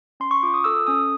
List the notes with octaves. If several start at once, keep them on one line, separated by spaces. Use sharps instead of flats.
C#4 C6
C#6
F4 D6
D#6
A4 E6
C#4 D#6